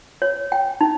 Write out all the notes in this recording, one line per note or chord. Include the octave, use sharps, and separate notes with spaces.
C#5
G5
D#4